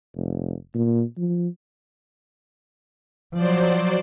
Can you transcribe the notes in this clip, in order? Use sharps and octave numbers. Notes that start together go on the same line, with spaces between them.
F1
A#2
F3
F3 F#3 C5 D5